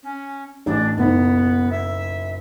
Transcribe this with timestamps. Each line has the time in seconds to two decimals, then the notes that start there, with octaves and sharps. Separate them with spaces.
0.03 C#4
0.66 A1 D4
0.97 F#1 B1 B3
1.71 E5